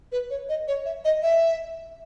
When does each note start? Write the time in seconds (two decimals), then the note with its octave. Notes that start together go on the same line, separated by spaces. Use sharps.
0.12 B4
0.30 C#5
0.49 D#5
0.68 C#5
0.85 E5
1.05 D#5
1.22 E5